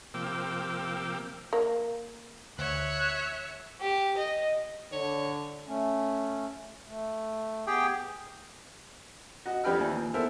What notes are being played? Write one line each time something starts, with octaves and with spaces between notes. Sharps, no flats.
C3 F3 A#3 G5 D6 E6
A#3
D2 C#5 E5 F#6
G4
D#5
D3 C#5
A3 C#4
A3
B3 G4 G#4 G5
F#4 D#5 F#5
F2 D4 G4 B4 G5 F6
D#2 E3
A#2
B3 E4 A4 A#4 C5 E5